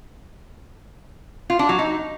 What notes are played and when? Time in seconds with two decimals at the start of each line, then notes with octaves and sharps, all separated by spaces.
1.50 F4
1.59 D4
1.69 F#3
1.79 D#4